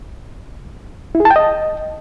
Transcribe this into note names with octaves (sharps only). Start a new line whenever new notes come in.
E4
G#4
A5
G5
D#5